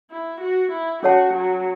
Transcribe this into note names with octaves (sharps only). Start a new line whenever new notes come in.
E4
F#4
E4
C#4 F#4 A4 C#5 F#5 A5
F#3